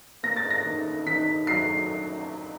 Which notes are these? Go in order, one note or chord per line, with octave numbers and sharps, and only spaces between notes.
A#3 A#6
A6
A#6
D#3
D#3 B6
F#3 C7